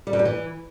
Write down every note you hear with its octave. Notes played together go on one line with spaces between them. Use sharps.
G3
G2
G3
E3